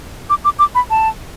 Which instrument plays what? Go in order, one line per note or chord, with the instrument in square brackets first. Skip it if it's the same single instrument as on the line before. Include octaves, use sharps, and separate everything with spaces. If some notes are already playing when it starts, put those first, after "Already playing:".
[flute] D6
D6
D6
B5
A5